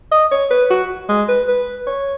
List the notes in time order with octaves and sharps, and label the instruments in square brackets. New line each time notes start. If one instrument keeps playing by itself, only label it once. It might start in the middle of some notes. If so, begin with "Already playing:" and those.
[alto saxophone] D#5
C#5
B4
F#4
G#3
B4
B4
C#5